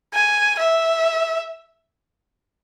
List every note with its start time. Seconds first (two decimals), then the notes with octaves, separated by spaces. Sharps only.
0.14 G#5
0.59 E5